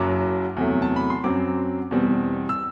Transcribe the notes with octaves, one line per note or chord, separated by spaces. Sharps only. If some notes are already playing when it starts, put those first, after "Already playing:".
Already playing: F#1 F#2 F#3 D6
E2 C3 F#3 A3
A5
B5
C6
F#2 F#3 C4 D6
E2 B2 G3 C4
E6